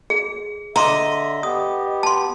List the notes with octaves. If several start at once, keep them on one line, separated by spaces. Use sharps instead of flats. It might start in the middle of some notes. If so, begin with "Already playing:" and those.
G#4
D3 D#5 E5 A#5 C6 D6
B3 G4 D#6
A5 C6